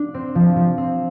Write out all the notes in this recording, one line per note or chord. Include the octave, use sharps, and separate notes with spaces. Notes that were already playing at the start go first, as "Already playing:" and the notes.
Already playing: D4
C4
F3
F3
C4